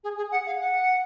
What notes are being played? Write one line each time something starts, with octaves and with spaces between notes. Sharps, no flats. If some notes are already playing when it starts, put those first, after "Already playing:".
G#4
G#4
F#5
F5
F#5